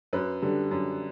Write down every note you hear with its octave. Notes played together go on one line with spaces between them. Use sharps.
F#2 B4
D3 G3
F#2